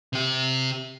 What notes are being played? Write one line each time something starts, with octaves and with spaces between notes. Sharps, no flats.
C3 G4